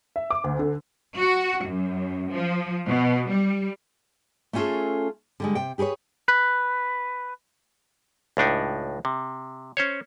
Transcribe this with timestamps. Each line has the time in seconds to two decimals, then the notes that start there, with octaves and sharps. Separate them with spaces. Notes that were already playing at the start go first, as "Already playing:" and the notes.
0.16 E5
0.30 D6
0.44 D2
0.59 D3
1.17 F#4
1.65 F#2
2.32 F3
2.87 B2
3.30 G3
4.53 A3 B3 C#4 F4 G#4 A4
5.40 D3 G3 G#3
5.55 C3 G5
5.78 G4 G#4 A#4 B4 C#5
6.28 B4
8.37 C#2 A2 D4 D#4
9.05 C3
9.77 C#4 C5 C#5